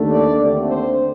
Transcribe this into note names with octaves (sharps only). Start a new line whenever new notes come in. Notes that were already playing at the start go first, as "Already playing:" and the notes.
Already playing: D#2 D3 A3
D5
D#2 D3 A3 C4
C5